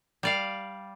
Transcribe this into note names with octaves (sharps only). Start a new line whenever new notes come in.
G3 D5 F5